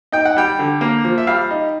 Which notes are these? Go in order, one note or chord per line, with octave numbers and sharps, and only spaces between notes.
D#4 G5
F#5
G3 G5
D3
A#3
F3
E5
G3 F5
D#4